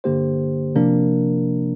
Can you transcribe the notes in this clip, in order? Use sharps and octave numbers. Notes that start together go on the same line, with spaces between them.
G2 D3 A#3 G4 C5
C3 F3 A#3 D4 A#4